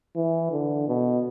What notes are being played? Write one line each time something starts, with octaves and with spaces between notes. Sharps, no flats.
E3
D3
B2